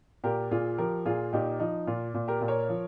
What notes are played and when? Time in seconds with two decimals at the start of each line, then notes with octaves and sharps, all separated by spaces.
0.24 A#2 G4 A#4
0.51 A#2 F4 G#4
0.78 F3 G4 A#4
1.05 A#2 F4 G#4
1.33 A#2 D#4 G4
1.60 F3 D#4
1.87 A#2 F4
2.14 A#2
2.28 G4 A#4
2.41 A#2
2.48 A#4 C#5
2.69 F3